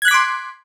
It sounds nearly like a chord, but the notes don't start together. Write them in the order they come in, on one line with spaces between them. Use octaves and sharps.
G#6 F#6 B6 D6 C6